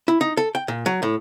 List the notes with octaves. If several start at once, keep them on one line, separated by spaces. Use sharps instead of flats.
E4
D#4
A4
G5
A#2
F#3
A2